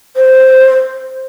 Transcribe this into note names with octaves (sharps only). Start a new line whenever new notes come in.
C5